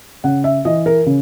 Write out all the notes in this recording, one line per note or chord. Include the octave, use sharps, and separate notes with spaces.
C#3 F#5
E5
E3 D#5
A#4
C#3